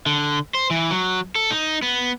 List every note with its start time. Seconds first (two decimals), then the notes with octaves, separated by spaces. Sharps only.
0.06 D3
0.54 C5
0.70 E3
0.91 F#3
1.35 A4
1.51 D#4
1.82 B3